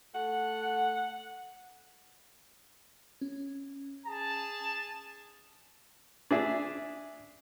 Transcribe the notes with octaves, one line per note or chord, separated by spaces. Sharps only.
A3 F#5
C#4
G#4 A5
D4 G#4 E5